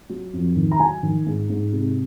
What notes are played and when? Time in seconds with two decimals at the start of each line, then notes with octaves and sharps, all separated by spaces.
0.09 F#3
0.33 F2
0.56 D#3
0.71 A#5
0.79 F#3 G#5
1.03 D#3
1.26 G#2
1.50 G#2
1.72 C3